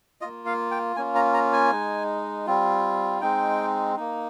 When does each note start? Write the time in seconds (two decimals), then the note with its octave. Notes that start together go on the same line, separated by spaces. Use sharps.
0.21 A#3 F4 D#5
0.46 F5
0.71 G5
0.96 A#3 C#4 F4 G#5
1.15 A#5
1.34 A#5
1.53 G#5
1.71 G#3 D#4
2.46 G3 C4 F4
3.21 G#3 C4 D#4 G5
3.96 A#3 D#4